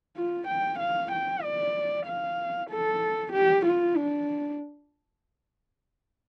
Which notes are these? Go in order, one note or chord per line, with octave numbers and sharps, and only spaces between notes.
F4
G5
F5
G5
D5
F5
A4
G4
F4
D4